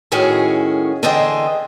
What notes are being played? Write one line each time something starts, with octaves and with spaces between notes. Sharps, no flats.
A2 D#3 C#4 F#4 G#4
D3 E3 G#4 C5 D#5 G5